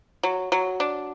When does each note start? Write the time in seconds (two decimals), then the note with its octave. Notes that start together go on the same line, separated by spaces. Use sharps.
0.23 F#3
0.52 F#3
0.80 D4